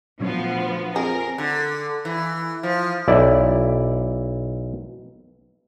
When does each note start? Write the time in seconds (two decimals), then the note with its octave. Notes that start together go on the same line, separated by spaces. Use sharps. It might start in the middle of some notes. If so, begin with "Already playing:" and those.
0.20 D2 A#2 F3 F#3 B3 C#4
0.96 F2 G#4 A#4
1.38 D3
2.05 E3
2.63 F3
3.08 B1 E4 D5